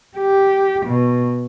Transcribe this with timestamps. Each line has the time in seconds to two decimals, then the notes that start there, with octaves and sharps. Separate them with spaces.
0.17 G4
0.86 B2